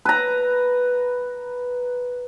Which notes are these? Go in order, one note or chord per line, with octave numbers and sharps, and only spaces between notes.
B4 A#5